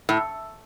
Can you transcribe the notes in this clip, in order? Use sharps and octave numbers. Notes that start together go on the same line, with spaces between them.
A2